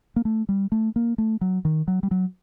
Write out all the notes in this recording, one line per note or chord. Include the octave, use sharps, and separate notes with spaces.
A#3
A3
G3
A3
A#3
A3
F#3
D#3
F#3
G3
F#3